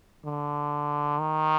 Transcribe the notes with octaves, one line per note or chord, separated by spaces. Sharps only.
D3
D#3